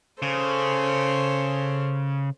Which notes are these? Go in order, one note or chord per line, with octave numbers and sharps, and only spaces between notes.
C#3 A4 C5 C#5